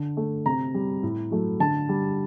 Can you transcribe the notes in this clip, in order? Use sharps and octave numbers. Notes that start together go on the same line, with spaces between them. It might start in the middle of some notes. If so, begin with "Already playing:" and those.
Already playing: D3
A3
C3 A#5
G3
A2
F#3 A3
D3 A5
G3